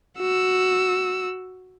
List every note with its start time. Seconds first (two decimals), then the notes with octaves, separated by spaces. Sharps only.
0.18 F#4 E6